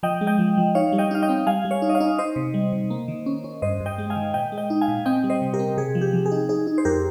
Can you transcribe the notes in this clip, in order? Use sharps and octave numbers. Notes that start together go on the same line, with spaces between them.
F3 D#5 G5
G#3
D#5 G5
F3
F3
D#4 C#5 F5
G3
D#5 G5
D#4 F5
D#5 G5
C4
G3 F5 G#5
G3
C#5 F5
D#4
D#5
C#5 F5
D#4
D#4 C5 D#5
C3
G3
C3
A#3
D#3
C#4
C#4
G2 C5 D#5
G2
D#5 G5
G#3
F5 G#5
D#3
A#2 D#5 G5
G#3
D#5 G5
D#4
F5 G#5
A#2
C4 D#5 G5
G3
C5 D#5
C3
G4 A#4
C4
C3 G#4
F3
G4
F3
G#4
D#4
D#4 G#4
D#4
C5
F2 G4 A#4